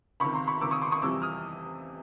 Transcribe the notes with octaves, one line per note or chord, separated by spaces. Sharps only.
C#2 C3 D#3 B5 C#6
A#5 C6
B5 C#6
C#2 C3 D#3 D6 E6
C#6 D#6
C6 D6
C#6 D#6
F2 C3 E3 G3 D6 E6
D#6 F6